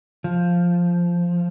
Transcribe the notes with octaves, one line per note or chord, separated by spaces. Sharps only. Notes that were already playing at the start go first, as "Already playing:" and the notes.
F3